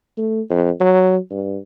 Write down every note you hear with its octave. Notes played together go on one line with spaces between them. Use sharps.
A3
F2
F#3
G2